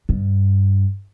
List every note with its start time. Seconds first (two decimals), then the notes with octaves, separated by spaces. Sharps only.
0.09 G2